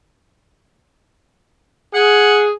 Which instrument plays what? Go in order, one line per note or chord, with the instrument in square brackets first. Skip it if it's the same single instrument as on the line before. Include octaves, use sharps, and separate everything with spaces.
[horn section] G#4 [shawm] F#5